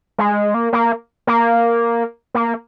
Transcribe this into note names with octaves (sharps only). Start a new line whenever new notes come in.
G#3
A#3
A#3
A#3
A#3